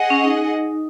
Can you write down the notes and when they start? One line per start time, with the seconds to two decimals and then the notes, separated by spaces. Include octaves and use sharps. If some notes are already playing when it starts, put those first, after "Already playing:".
Already playing: G#4 D#5 F#5
0.10 C#4
0.24 D#4